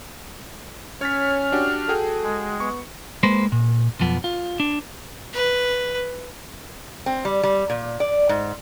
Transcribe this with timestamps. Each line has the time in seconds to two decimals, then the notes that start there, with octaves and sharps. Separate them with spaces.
1.01 C#4 C#5 F6 A6 B6
1.52 D4 F#4 G4
1.89 F#4 G#4 A4 G5
2.23 G#3
2.60 B3 C#6
3.23 G#3 A#3 B4 C5
3.52 A#2
4.00 B1 F2 F3 B3
4.24 F4
4.60 D4
5.34 B4
7.06 C4
7.25 G3
7.43 G3
7.70 A#2
8.00 D5
8.29 G#2